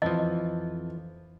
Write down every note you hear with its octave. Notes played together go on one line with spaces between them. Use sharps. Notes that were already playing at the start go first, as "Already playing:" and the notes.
F2 E3 F3 D#5 A5